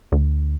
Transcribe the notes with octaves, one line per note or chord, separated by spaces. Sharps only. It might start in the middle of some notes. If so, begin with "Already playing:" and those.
D2